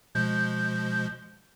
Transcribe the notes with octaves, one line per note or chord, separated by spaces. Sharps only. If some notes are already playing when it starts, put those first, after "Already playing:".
B2 F3 G#3 G6